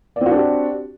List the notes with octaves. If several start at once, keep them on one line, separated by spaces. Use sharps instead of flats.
C4 D4 F#4 G4 D5